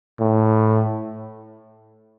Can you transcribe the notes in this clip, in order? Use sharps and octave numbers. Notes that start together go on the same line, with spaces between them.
A2